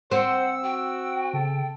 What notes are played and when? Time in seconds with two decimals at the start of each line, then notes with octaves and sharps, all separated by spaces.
0.12 C4 C5 F#5 E6
0.63 F#4 G5
1.33 C#3 A4